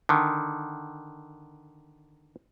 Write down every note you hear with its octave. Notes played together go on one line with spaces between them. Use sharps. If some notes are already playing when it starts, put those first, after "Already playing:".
D3 D#3